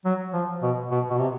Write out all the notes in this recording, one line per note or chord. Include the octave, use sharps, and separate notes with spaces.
F#3
F3
B2
B2
B2
C3